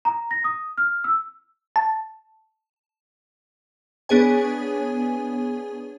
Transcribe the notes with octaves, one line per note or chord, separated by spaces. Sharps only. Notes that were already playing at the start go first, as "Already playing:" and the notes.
A#5
A#6
D#6
F6
E6
A5
B3 D4 G#4 C#5 G#5